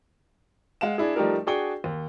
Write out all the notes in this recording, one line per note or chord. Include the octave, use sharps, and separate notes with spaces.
G#3 F5 F#5 E7
D4 E4 G#4
F3 G3 A3 D#4 G4 A#4
D4 F#4 G#4 G5 C#6 G7
D#2